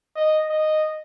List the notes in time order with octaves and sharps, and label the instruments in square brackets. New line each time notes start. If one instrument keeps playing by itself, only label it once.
[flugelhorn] D#5
D#5